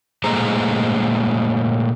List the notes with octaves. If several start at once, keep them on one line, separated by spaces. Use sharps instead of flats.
A#2 G#3 A3 C5 A#5